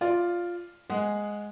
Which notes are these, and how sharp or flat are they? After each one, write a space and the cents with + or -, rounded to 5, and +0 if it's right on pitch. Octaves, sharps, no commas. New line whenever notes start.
F4 +0 D5 +0
G#3 +0 G#4 +0 F#5 +0